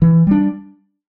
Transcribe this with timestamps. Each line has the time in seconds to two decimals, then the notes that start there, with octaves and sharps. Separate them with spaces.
0.02 E3
0.27 G3 D4